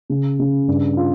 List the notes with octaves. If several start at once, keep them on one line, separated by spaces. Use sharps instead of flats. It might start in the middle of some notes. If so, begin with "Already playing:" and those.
C#3
C#3
G2
F4